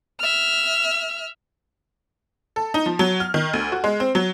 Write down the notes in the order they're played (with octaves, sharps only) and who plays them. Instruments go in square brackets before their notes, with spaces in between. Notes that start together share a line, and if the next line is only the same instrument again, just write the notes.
[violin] E5 F6
[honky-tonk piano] A4
D#4
F3
F#3
F6
D#3
D2
F#4
G#3
C4
F#3